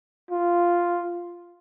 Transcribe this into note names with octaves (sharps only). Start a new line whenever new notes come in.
F4